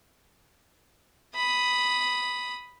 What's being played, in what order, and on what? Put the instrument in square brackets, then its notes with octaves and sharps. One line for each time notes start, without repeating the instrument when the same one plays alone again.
[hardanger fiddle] B5 D#6